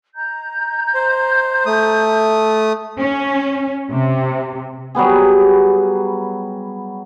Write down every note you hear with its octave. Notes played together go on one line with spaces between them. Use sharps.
D#5 A#5 G6
C5
A3 D#6
C#4
C3
F#3 G3 B3 G#4